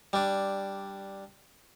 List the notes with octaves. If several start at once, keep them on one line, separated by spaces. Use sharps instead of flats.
G3 D4